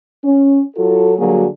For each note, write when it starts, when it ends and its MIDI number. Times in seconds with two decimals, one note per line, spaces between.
0.24 0.61 61
0.77 1.13 54
0.77 1.13 65
0.77 1.13 66
0.77 1.13 69
1.19 1.47 50
1.19 1.47 54
1.19 1.47 55
1.19 1.47 58
1.19 1.47 66
1.19 1.47 68